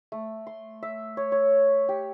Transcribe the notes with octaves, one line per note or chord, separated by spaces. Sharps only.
A3
C6
E5
C#5
C#5
G4